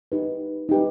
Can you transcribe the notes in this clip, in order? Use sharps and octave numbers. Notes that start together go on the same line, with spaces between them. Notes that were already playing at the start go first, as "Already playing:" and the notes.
D#4 G4 B4
D#4 G4 B4